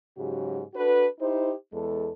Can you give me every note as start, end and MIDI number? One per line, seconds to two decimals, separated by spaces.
0.18 0.62 44
0.18 0.62 49
0.18 0.62 54
0.18 0.62 66
0.18 0.62 67
0.74 1.05 62
0.74 1.05 66
0.74 1.05 69
0.74 1.05 71
1.20 1.52 63
1.20 1.52 64
1.20 1.52 67
1.20 1.52 72
1.72 2.10 40
1.72 2.10 56
1.72 2.10 69